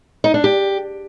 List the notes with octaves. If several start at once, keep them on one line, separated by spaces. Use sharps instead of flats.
D#4
D4
G4